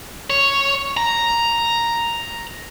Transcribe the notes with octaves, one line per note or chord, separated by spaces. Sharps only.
C#5
A#5